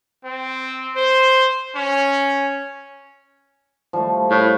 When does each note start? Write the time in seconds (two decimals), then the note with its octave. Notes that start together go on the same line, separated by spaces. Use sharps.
0.25 C4
0.96 C5
1.75 C#4
3.93 F3 G3 A3
4.31 A2